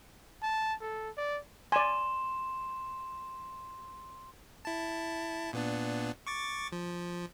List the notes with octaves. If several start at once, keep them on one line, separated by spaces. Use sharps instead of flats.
A5
A4
D5
D5 G#5 C6 E7
E4 A5
A#2 B3 D4
C#6 D6 A6
F3